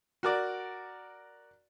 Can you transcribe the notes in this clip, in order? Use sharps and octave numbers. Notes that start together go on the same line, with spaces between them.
F#4 A#4 D5